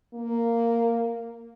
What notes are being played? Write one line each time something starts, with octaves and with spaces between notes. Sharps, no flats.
A#3